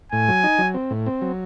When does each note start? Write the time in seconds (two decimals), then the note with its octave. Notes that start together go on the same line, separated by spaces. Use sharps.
0.12 A2 G#5
0.28 F#3
0.43 D#4
0.59 F#3
0.74 C4
0.91 A2
1.06 C4
1.21 F#3